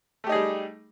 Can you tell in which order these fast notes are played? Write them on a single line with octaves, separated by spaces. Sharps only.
A3 G4 D#4 G#4 G3